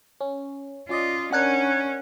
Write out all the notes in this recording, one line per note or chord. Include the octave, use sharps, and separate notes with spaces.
C#4
C#4 F4 D5 D#5
C#4 D4 A#4 F#5 F#6 G#6